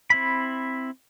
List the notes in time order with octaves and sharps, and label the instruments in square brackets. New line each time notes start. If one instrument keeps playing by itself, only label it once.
[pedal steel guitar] C4 E4 B5